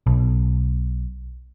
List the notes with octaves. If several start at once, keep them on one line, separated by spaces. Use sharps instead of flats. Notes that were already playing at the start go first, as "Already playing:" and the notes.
B1